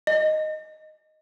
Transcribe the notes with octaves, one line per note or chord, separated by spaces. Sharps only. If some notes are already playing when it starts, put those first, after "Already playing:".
D#5